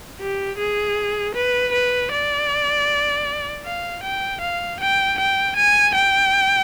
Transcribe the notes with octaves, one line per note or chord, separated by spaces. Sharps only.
G4
G#4
B4
B4
D5
F5
G5
F5
G5
G5
G#5
G5